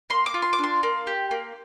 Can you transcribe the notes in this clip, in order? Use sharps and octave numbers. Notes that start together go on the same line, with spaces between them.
A#3 C6
D6
F4
C6
D6
D4 C6
A#3
G4
A#3